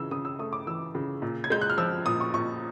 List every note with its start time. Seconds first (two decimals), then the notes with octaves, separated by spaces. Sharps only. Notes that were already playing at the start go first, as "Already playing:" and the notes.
Already playing: C#3 E3 E6
0.11 C#3 D#6
0.25 E6
0.39 A3 D#6
0.53 D6
0.66 E3 E6
0.95 C#3
1.22 A#2
1.44 G#6
1.50 G#3 G6
1.61 F#6
1.70 F6
1.78 F3 E6
2.06 A#2 D#6
2.20 C#6
2.34 A#2 C#6